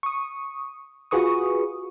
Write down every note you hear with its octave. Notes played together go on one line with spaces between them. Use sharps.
C#6 D#6
F4 F#4 G#4 B4 C#6 D#6